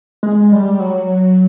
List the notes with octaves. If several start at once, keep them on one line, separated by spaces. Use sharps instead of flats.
G#3
G3
F#3